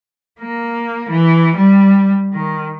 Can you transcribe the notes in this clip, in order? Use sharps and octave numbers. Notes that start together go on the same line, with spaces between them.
A#3
E3
G3
D#3